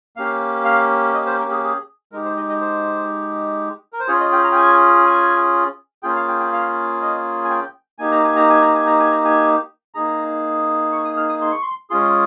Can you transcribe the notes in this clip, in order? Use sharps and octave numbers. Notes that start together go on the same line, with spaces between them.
A#3 C#4 G4 F5
F5
D#5
C5
A#4
G#4
G#4
G#3 D#4 G4 A#4
C5
D#5
D#5
C5
A#4
C5
C#4 F4 G#4 C#5
D#5
G5
A#5
G5
G#5
G#5
A#3 C#4 F4 G#4 G5
F5
G5
G5
F5
D#5
G#5
G5
A#3 D#4 G4 G#5
A#5
G#5
A#5
G#5
A#5
G#5
A#5
G#5
A#5
G#5
A#3 D#4 G#4 A#5
C#6
D#6
F6
D#6
C6
C#6
C6
G#3 C#4 F4 G#4 C6